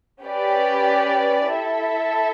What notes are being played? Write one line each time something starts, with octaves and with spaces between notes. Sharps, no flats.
C#4 G4 B4 D5
E4 A4 E5